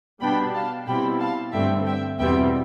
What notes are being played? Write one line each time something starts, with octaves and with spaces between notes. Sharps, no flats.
B2 G3 D4 G5 B5
F5 A5
B2 G3 C4 E4 G5 B5
F5 A5
G2 D3 A3 C4 E5 G5
E5 G5
E2 B2 G3 C4 E5 G5